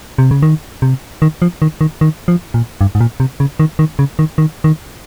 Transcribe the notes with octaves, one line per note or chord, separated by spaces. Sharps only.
C3
C#3
D#3
C3
D#3
F3
D#3
D#3
D#3
F3
A#2
G2
G#2
A#2
C3
C#3
D#3
D#3
C#3
D#3
D#3
D#3